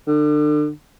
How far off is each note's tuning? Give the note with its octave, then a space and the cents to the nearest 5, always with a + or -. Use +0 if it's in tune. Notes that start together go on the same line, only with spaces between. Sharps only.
D3 +35